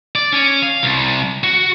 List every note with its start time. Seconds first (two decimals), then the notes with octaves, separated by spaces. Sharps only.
0.15 D5
0.33 C#4
0.62 F5
0.83 C2
1.44 F#4